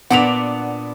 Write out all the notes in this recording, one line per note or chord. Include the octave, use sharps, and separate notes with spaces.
A#2 B3 D4 F#5 B5 F7